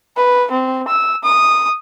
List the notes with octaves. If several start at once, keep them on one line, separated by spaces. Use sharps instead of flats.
B4
C4
E6
D#6